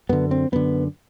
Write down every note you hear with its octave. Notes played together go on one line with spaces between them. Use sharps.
F#2 D3 B3
C4
F#2 D3 B3